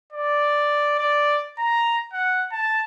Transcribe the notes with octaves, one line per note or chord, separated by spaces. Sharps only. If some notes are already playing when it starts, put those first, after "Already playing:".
D5
D5
A#5
F#5
A5